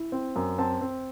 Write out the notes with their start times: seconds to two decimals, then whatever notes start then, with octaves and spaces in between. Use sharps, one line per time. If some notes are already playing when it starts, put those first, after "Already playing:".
Already playing: E4
0.12 C4
0.36 F#2
0.58 C4 A5
0.81 C4